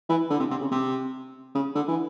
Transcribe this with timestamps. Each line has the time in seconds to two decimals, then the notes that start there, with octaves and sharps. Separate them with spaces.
0.09 E3
0.30 D3
0.40 C3
0.50 C3
0.61 C#3
0.71 C3
1.55 C#3
1.75 D3
1.88 E3